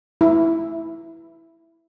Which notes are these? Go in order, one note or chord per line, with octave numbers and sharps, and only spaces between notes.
E4